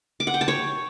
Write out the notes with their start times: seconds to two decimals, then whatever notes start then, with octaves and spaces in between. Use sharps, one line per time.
0.20 D6
0.27 F#5
0.34 G5
0.41 A5
0.48 C#5